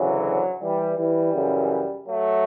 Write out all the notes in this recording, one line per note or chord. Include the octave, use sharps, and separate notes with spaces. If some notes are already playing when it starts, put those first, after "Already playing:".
Already playing: D2 C#3 E3 F#3
E3 G3
E3 G3
F#2 C#3 E3
F#3 A3